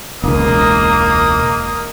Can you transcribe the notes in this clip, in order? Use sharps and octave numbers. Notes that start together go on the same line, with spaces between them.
E1 C#2 A#3 D#5 A#5 D#6